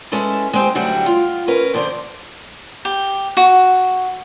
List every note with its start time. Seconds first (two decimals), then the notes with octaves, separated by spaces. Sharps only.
0.12 G#3 C#4 E4 A4 B4
0.53 G#3 C4 G4
0.75 D2 D3 F#3 G3 E4 G5
1.06 F4
1.48 C#4 A#4 B4
1.74 F2 D3 C5 D5
2.85 G4
3.37 F#4